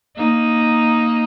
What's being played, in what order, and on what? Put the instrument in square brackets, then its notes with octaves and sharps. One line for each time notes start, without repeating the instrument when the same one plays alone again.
[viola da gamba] A#3 D#4